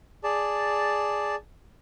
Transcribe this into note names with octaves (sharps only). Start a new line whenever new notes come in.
G#4 D5 A5